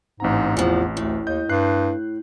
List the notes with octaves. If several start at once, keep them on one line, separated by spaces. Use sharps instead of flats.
A1 G#2 C4 A#5
E2 E3 F3
D2 A2
D#2 D#5 G6
G2 F#6 C7